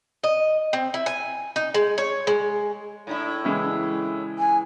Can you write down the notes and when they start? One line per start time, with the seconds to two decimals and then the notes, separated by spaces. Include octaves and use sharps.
0.23 D#5
0.73 C4
0.94 E4
1.06 G#5
1.56 D#4
1.74 G#3
1.98 C#5
2.27 G#3
3.07 A2 D4 E4
3.44 C#3 E3 G#3
4.39 G#5